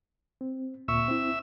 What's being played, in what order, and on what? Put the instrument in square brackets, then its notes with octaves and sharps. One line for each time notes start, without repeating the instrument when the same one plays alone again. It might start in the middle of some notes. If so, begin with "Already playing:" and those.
[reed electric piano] C4
[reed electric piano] D2 A#2 C#6 [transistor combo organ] E5
[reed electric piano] C4 E4